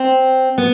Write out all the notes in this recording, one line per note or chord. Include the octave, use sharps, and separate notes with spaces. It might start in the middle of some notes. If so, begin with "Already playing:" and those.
Already playing: C4
B3